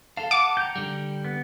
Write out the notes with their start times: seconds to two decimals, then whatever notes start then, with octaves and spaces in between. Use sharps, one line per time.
0.17 A4 F5 A5
0.31 F#5 D6
0.57 G5 A#5
0.76 D3 G3
1.25 B3